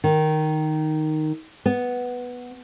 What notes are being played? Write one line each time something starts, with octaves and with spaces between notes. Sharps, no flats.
D#3
B3